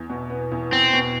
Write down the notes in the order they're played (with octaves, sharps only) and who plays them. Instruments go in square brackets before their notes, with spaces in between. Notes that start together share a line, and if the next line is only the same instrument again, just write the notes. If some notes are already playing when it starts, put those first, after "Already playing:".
Already playing: [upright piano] E2
B2
B3
E2
[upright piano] E2 [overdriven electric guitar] C4
[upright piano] B2